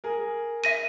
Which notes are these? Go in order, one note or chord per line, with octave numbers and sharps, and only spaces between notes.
G#4 A#4
E5 A#6 D#7